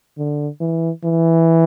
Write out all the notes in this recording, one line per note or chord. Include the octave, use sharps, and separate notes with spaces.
D3
E3
E3